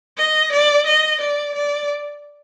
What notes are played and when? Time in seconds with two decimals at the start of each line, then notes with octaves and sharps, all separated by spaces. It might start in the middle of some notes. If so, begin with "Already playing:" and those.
0.17 D#5
0.53 D5
0.87 D#5
1.21 D5
1.56 D5